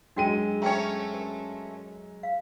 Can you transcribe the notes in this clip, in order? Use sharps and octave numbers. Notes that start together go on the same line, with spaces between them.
F#2 G#3 D4 F#4 G5 D#7
A3 C#4 C#5 G5 A#5
A#4
F5